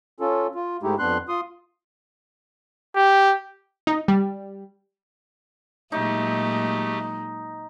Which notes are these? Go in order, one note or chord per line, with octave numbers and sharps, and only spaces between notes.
C#4 F4 A4
F4
G#2 G#3 A3 D#4 E4 G4
F2 B3 D4 C6 F#6
F4 C6 D#6
G4
D#4
G3
A#2 F#3 G#3 A3 D#4 G4